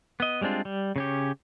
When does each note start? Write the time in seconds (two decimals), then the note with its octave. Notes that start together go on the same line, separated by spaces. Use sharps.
0.20 B3 D#5
0.41 G3 G#3 C4 D4 F4
0.65 G3
0.96 C#3 C#4 G4